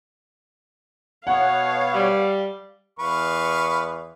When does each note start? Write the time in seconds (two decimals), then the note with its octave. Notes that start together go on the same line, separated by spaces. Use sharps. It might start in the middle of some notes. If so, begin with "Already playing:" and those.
1.27 B2 B3 C#5 F5 F#5
1.94 G3
2.99 E2 B4 F5 C#6